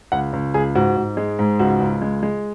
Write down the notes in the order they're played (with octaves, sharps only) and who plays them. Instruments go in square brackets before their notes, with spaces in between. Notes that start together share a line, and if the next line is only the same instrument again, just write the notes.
[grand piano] C#2 F#5
C#2
C#2 G#4
G#2 F#4
G#2
G#3
G#2
C#2 F#4
C#2
G#3
G#3